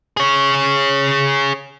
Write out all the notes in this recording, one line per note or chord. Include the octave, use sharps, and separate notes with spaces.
G#4 C#5